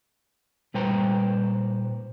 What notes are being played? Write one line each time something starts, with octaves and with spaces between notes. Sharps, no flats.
A#2 G3 B4 C5 G5 A#5